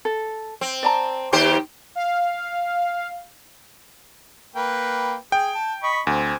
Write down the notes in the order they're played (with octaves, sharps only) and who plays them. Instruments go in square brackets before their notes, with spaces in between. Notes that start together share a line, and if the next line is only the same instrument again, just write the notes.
[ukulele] A4
[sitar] C4
[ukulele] D5 A5 A#5
[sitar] D#2 G4 C5
[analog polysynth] F5
[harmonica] A#3 B4 G5
[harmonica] G#4 [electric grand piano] G5
[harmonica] A5
D#5 B5 C#6
[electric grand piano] D2 [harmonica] C4 G#5